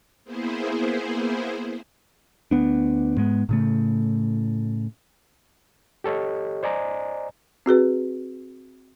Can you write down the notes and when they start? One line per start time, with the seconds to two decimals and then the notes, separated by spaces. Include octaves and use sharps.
0.25 A#3 B3 E4 G#4 C5
2.51 D2 B3 D4
3.17 G#2 G#3 B3
3.49 A2 C#3 A3
6.04 G4 A4 C#5 D#5
6.63 C5 D5 D#5 G#5 A#5
7.66 C4 F#4 G#4 B4